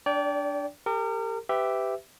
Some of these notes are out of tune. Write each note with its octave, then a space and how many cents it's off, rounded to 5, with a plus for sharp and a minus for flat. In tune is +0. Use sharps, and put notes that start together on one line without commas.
D4 +0 D5 -35 G5 +0
G4 +25 A#4 -35
G4 +0 B4 +30 E5 +0